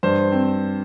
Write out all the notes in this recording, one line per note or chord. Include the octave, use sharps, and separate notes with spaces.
G2 C5
C4